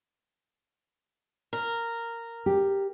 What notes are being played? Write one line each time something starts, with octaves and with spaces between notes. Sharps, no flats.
A#4
G4